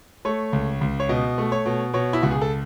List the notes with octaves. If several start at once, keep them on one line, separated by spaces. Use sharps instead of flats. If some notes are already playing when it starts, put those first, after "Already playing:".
A3 C#5
C#2
C#2
C#5
B2 D#5
A3
C#5
B2
B2 C#5
E4
C#2 F#4
G#4
A4